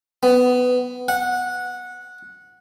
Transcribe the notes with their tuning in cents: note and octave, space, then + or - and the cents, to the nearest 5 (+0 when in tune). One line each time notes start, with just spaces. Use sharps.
B3 +15
F#5 -15